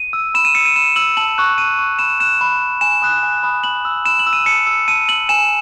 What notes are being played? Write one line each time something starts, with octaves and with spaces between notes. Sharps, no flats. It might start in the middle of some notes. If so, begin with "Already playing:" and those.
Already playing: D#7
E6
B5 E7
D#7
E6 C#7
D#7
B5 E7
E6 F#7
A5 F#7
C#6 F#6
A5 D#7
C#6 F#6
B5 E7
F#6 E7
B5
F#6
G#5 E7
B5 D#6 F#6
G#5
B5 D#6 F#6
B5 F#7
E6
B5 E7
F#7
E6
D#7
A5 C#7
E6
A5 D#7
E6 F#7
G#5 E7